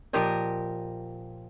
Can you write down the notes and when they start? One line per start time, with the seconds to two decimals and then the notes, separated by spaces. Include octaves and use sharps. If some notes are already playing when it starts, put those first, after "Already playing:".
0.13 A#2 F3 G4 A#4 D#5